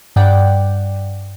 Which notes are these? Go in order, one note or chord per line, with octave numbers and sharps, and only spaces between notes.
G2 D5 F#5 G5